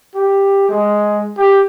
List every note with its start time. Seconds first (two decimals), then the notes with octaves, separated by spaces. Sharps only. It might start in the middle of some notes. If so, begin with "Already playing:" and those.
0.15 G4
0.69 G#3
1.38 G4